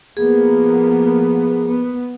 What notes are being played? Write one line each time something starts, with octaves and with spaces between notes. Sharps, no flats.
F3 A#3 B3 G#4
B3